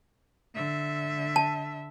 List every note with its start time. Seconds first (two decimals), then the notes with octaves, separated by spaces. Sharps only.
0.55 D3 E5
1.36 A5